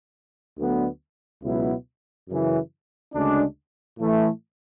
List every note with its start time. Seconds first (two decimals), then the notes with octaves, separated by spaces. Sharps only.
0.57 D2 D3 F#3 B3
1.43 C#2 B2 F#3 B3 E4
2.29 F#2 C#3 E3
3.14 D2 C#3 G#3 D4
3.99 A2 E3 A3